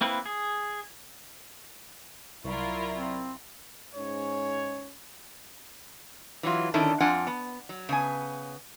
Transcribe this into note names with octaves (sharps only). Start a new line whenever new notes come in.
A#3 C4 E4 B4
G#4
C2 F#3 E4 F4 A#4 D5 C#6
C4
G#2 C#4 C#5
E3 F#3 F4
D3 D#3 C#4 D4 E4 A4
F2 D4 F4 F#5 G#5
B3
F#3
C#3 B3 G#5